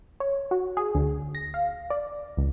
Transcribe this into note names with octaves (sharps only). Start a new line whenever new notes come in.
C#5
F#4
G#4
D2
A#6
F5
D5
C#2